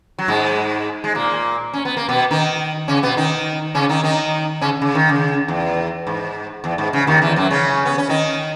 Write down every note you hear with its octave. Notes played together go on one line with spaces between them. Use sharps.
F#3
G#2 G#3
G#3
A#2 A#3
C#4
B3
A#3
B2 B3
D#3 D#4
C#3 C#4
B2 B3
D#3 D#4
C#3 C#4
D#3 D#4
D#3 D#4
C#3 C#4
C#3
D#3
C#3
E2
G#2
E2
G#2
C#3
D#2 D#3
E2 E3
F#2 F#3
C#3 C#4
B3
C#4
D#3 D#4